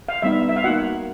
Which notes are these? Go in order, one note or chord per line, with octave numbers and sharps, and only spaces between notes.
F5
G3 B3 D#4 E5
E5
F5
A#3 D#4 F#4 F#5